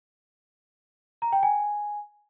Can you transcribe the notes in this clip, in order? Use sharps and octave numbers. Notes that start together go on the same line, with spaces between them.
A#5
G5
G#5